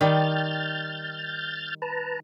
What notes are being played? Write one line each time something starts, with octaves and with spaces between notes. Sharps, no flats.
D#3 G3 F6 G6 A6
B4 A5 A#5